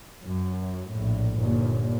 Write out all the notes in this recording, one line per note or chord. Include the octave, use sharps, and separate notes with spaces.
F#2
A#1 A2
G1 D#2 A#2